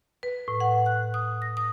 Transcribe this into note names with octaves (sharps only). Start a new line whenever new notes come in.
B4
A2
F#5
F#6
D#6
A#6
D#6